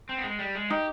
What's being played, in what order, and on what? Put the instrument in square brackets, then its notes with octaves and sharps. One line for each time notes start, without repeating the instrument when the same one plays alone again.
[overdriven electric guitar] C4
B3
G#3
G3
G#3
[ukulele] D#4 [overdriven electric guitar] G4